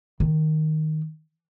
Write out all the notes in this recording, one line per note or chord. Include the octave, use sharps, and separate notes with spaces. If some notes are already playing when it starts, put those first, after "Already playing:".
D#3